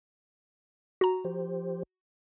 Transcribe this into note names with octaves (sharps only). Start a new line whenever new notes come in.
F#4 A#5
F3 G4 C5